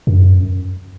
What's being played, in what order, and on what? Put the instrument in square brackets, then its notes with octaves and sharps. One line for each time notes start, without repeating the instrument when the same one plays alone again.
[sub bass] F#2